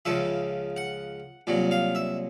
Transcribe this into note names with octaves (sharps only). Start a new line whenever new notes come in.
C#2 C#3 F3 E5
F#5
C2 A#2 F#3
F5
E5